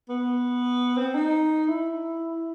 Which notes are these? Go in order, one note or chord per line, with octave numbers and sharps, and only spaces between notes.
B3
C4
D#4
E4